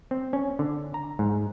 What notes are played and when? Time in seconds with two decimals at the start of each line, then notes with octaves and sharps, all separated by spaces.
0.11 C4
0.33 C#4
0.59 D3
0.94 A#5
1.19 G#2